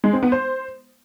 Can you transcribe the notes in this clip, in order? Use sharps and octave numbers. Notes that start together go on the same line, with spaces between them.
G#3
C4
B3
C5